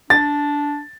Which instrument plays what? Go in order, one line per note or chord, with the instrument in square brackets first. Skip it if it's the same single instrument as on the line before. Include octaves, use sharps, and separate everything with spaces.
[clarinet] D4 [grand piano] A6